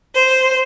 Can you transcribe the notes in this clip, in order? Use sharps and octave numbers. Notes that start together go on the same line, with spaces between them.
C5